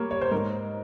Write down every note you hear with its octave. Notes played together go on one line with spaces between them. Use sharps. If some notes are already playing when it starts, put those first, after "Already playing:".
Already playing: G3 A#3 C#5
C#5
C5
G#2 A#4